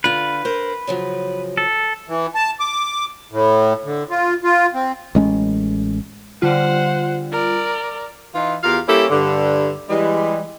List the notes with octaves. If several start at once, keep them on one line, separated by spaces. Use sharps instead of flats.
D3 F4 B4
A#4 C5
C#3 F3 F#3
A4
E3
A5
D6
A2
D3
F4
F4
C4
A1 G#3 C#4
D3 G3 F4 C5 F#5
A#4 D5
E3 D#4 F4
E2 F4 G4 A#4 F5
G3 A#3 C#4 E4 G4 A4
G2 D3
E3 G3 G#3